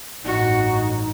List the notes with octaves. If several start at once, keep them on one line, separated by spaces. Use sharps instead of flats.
A1 G2 D#4 F#4